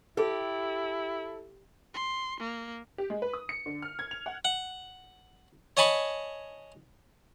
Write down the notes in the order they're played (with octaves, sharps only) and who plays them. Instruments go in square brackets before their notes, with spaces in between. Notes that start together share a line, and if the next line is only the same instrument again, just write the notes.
[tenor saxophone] E4 [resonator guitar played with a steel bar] G4 [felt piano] A4
[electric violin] C6
A#3
[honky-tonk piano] G4
G#3
B4
D#6
C#7
D3
F6
G#6
F7
F#5
[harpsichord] F#5
C#5 D#5 G#5 A5 B5 C#6